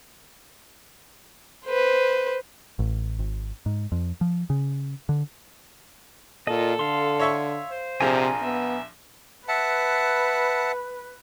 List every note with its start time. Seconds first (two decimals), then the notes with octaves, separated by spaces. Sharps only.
1.66 B4 C5
2.79 A1
3.19 G#1
3.66 G#2
3.92 F2
4.21 F3
4.50 C#3
5.09 D3
6.47 A#2 F4 A4 D#5
6.79 D3 F5 C6
7.20 C#5 E5 C#6
7.71 C5
8.01 A#1 C3 F3 G#4 G#5 A#5
8.42 B3 E5
9.48 B4 E5 F#5 A5